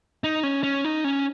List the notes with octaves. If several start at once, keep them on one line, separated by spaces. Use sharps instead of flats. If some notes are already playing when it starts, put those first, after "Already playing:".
D#4
C#4
C#4
D#4
C#4